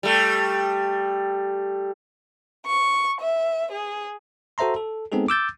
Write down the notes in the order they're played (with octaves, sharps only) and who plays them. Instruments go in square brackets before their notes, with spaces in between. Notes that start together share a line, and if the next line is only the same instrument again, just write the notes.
[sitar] G3 A3
[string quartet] C#6
E5
G#4
[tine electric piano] F#4 A4 C5 E5 A#5 C6
A4
G#3 B3 C4 D#4 G#4 A4
D6 E6 G6 A6